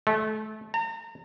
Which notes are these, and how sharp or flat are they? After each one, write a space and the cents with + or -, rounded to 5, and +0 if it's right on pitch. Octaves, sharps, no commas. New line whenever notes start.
A3 -25
A#5 -35